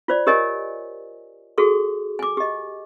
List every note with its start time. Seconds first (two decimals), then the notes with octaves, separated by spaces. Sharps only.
0.08 F4 C5 D5
0.27 G4 A#4 C#5 D#5 G#5
1.58 F#4 G#4 A4 C#6
2.19 G#5 D6
2.37 G4 D#5